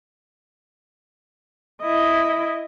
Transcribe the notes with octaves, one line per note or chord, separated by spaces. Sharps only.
E4 D#5